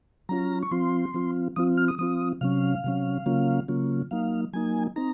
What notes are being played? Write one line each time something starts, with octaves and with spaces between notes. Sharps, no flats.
F#3 C#4 F4 A#5
C#6
F3 C4 F4 C6
F3 C4 F4
F3 C4 F4 D#6
F6
D#6
F3 C4 F4 D#6
C3 F#3 C#4 F5
C3 F#3 C#4
C#3 F#3 A#3 C#4 F4
C#3 F#3 A#3 C#4 F4
F#3 A#3 D#4 F5
F#3 A#3 D#4 G#5
C4 D#4 A#5